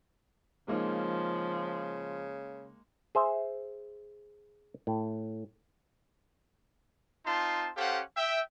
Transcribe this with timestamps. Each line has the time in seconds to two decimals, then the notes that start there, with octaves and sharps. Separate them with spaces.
0.68 C#3 F3 G#3 A#3 D#4
3.15 G#4 C5 E5
4.87 A2
7.26 C4 D#4 F4 A5 C6
7.77 C#4 G4 A4 C5 F5 F#5
8.17 E5 G5